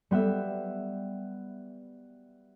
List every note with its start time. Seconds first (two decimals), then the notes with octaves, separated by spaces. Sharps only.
0.11 G3 B3 B4 E5